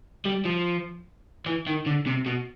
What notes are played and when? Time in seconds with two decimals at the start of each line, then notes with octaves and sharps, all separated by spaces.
0.26 G3
0.46 F3
1.46 E3
1.67 D#3
1.86 D3
2.07 C3
2.26 B2